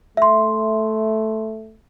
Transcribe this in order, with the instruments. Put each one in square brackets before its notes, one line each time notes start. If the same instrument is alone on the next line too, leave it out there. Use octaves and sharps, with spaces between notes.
[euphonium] A3 [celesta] E5 C6